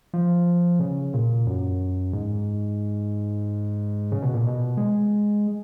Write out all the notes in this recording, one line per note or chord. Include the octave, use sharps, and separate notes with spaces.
F3
C#3
A#2
F#2
G#2
C#3
B2
A#2
B2
G#3